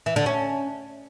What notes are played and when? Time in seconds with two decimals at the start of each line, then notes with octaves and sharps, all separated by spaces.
0.06 E3
0.16 D3
0.26 C#4